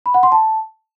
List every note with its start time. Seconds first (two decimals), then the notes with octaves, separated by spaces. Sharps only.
0.06 B5
0.14 F#5
0.23 C6
0.32 A5